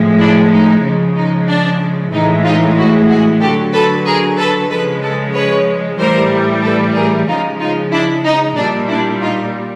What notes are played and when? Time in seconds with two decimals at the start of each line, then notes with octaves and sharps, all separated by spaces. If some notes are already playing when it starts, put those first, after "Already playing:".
Already playing: A2 F3 G#3
0.19 D4 E4
0.52 D#4
0.84 C#3 F3 G#3
1.16 D#4
1.48 D4
2.13 A2 E3 G#3 D#4
2.44 D#4 F4
2.77 E4 F#4
3.09 F#4 G#4
3.41 D3 F#3 G4 A4
3.73 A4 B4
4.05 G#4 A#4
4.38 A4 B4
4.70 C#3 F3 G#3 A4 B4
5.02 A4 B4
5.34 B4 C#5
5.99 A2 E3 G3 A#4 C5
6.63 A4 B4
6.95 G#4 A#4
7.28 C#3 F3 G#3 D#4 F4
7.59 D#4 F4
7.92 D4 E4
8.25 D#4
8.56 A#2 G3 D4
8.88 D4 E4
9.22 D#4 F4